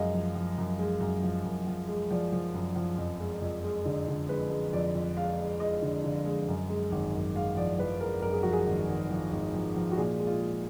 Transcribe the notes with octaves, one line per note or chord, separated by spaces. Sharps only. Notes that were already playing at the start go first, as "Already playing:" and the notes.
Already playing: F#2 F3 G#3 D#5 F5
F3
F3
F#2
G#3
F#2
F3
F#2
F3
G#3
F3 D5
F3
F#2
F3
F2
G#3
F2
G#3
D3
D3
G#3 B4
G#3
F2 D5
F2
G#3 F5
G#3
G#3 D#5
D3
D3
G#3
F#2
G#3
G#1
F#2
G#3 F5
F3 D5
F3 B4
G#3 A#4
F#2 A#4
G#4
F3 F#4
G#4
G#1
G#1
F3
G#1
F3
F3
F#4
A#2 G#4
G#3
F4
G#3